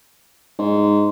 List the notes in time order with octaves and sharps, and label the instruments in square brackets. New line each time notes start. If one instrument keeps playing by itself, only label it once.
[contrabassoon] G#2